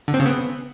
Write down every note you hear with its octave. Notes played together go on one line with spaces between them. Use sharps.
D3
C4
C#3
B3